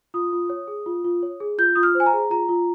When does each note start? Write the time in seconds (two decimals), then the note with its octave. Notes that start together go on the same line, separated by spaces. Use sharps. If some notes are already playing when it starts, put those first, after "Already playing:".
0.14 F4 D#6
0.33 F4
0.50 C#5
0.68 G#4
0.86 F4
1.04 F4
1.23 C#5
1.40 G#4
1.58 F4 G6
1.75 F4 D#6
1.83 F6
1.95 C5
2.00 G#5
2.06 A#5
2.13 G#4
2.30 F4 A#5
2.49 F4